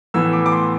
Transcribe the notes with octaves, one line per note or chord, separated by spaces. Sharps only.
A2 E3 B3 E6
D6
D6
C6